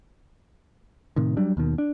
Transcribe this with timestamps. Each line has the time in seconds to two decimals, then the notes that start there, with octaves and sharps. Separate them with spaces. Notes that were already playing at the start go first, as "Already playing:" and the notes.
1.16 A2 C3 D#3
1.37 F#3 G3 D4
1.57 D#2 B2 D#3
1.78 D4